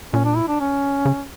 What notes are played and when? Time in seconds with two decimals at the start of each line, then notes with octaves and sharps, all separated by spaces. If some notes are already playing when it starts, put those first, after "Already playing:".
0.13 A#2 C#4
0.25 D4
0.36 E4
0.48 D4
0.60 C#4
1.05 C#3